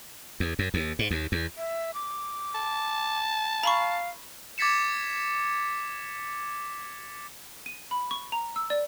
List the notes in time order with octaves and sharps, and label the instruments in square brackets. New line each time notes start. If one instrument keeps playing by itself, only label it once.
[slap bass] E2
F#2
D#2
G#2
D#2
E2
[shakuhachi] E5
D6
[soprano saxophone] A5
[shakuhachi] F5 [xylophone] A#5 B5 C#6
[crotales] D6 G#6 A6 B6 C#7 E7
[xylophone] D#7
B5
C#6
A#5
E6
D5